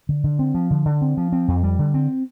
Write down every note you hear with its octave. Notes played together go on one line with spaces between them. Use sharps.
D3
D3
C4
F3
D3
D3
C4
F3
C4
F2
G3
D3
C4